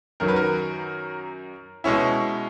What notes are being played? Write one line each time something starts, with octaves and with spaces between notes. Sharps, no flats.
F#2 D#3 F#3 A#4
B4
A#4
B2 G#3 C#4 E4